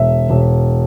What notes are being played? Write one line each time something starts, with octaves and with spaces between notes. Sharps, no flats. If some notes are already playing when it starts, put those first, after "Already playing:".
Already playing: E1 E5
E1